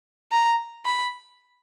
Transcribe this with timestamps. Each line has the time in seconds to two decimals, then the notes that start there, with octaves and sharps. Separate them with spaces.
0.32 A#5
0.85 B5